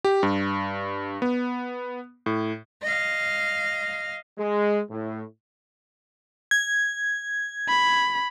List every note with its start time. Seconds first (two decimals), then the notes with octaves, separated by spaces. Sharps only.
0.04 G4
0.23 G2
1.22 B3
2.26 A2
2.83 D#5 F5
4.38 G#3
4.90 A2
6.51 G#6
7.69 B5